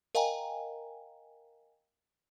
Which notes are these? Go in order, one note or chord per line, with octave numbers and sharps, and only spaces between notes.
A#4 D#5 F5 G5 G#5 A#5